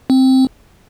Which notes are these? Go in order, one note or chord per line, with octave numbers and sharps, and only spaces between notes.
C4